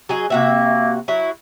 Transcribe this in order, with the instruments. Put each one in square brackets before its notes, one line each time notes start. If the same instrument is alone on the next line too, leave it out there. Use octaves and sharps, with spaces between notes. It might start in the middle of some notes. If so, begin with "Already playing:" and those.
[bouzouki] F#3 G#4 D#5
[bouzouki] C3 F#4 E5 [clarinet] A#3
[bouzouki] F#3 E4